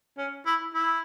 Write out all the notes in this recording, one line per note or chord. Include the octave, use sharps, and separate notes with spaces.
C#4
E4
E4